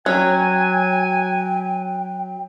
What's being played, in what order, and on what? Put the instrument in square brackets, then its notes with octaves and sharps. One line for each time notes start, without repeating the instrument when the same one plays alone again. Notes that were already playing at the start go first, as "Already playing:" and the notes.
[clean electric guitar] F#3 [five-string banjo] C#4 [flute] G5 [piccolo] G#5